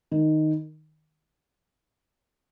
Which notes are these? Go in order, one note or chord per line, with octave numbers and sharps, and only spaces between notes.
D#3